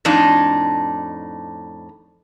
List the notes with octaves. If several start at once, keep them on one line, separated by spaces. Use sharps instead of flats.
F2 A2 D4 D#4